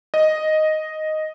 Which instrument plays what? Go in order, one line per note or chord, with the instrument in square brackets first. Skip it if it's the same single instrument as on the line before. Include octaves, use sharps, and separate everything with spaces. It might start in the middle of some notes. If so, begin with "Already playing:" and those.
[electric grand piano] D#5